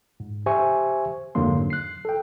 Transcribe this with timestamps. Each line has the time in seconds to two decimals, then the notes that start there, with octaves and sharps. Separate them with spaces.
0.20 G#2
0.46 G4 C5 E5 G#5 C#6
1.35 F2 G#2 D3 F#3 A#3 C6
1.70 F#6 C7
2.05 A4 G5